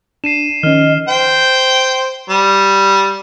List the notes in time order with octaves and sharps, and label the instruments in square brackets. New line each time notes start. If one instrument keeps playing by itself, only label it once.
[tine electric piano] D4 [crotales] C7 D#7 E7
[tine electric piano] D#3 [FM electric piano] F3 C#4 [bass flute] D#5 [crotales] F6
[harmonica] C5 G5
G3